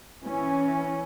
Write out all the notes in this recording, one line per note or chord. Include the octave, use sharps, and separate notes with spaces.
E3 C#4